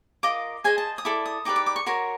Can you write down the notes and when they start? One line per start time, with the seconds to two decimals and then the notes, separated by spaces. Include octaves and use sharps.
0.23 F4 A#4 D#5 D6
0.64 G#4 C5 D#5 G#5
0.78 A5
0.98 D#6
1.05 E4 A4 D5 D6
1.26 D#6
1.45 D#4 G4 B4 D5 D6
1.56 D6
1.66 D6
1.76 C#6
1.86 F#4 A#4 C#5 C6